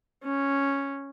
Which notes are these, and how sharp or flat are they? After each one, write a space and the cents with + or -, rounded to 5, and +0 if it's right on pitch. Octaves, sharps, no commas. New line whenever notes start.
C#4 -5